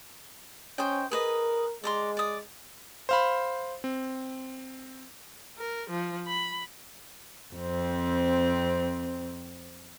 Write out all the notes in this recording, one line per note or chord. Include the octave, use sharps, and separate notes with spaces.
C#4 C5 D#5 G5
G#4 A#4 B4 D#5
G#3 D5 A#5 C6
D5 D#6
C5 F5 B5
C4
A#4
F3
B5
F2 C4